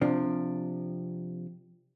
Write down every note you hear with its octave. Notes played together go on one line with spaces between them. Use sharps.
C3 F3 D4